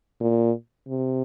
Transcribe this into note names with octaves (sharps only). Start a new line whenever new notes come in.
A#2
C3